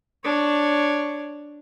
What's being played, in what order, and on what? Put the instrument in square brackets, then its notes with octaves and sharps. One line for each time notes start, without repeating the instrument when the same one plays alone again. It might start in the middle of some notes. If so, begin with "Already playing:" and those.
[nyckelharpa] D4 C#5